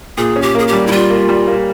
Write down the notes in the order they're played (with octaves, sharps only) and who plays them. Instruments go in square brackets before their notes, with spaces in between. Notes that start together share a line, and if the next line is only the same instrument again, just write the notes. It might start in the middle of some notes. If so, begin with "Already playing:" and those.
[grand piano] A#2 [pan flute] G#4
[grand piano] C#4
[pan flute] G4
[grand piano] A#3 [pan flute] G#4
[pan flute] G4
[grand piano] G3
[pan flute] E4
[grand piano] G3 [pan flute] F4
[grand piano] A#3
G3
A#3